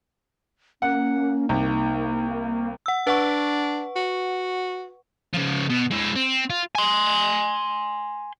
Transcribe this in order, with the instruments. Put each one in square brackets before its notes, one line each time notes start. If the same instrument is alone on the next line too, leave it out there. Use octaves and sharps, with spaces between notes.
[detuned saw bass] A#3 [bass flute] C#4 [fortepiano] F#5
[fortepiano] C2 [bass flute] D#4
[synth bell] F#5 E6
[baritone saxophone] D4 [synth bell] B4 F#5 C#6
[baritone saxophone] F#4
[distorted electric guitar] C#3 F3
B2
G#3 E4
C4
F4
G#5 C6